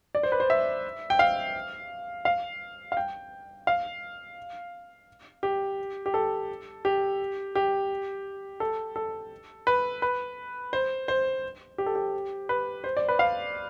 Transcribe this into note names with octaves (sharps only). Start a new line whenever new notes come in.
D5
C5
B4
C5
E5
G5
F5
F5
F5
G5
F5
G4
G4
A4
G4
G4
A4
A4
B4
B4
C5
C5
G4
A4
G4
B4
C5
D5
B4
F5